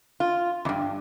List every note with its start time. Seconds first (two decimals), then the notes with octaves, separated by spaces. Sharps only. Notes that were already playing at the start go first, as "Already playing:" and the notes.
0.20 F4
0.65 E2 G2